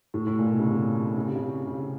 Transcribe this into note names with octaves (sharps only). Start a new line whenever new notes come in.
A2
A2
A#2
B2
C#3
C3
C#3
C3
C#3
C#3